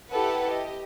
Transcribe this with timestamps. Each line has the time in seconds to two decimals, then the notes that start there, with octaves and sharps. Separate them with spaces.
0.11 E4 G4 A4 B4 F#5
0.47 G4 D#5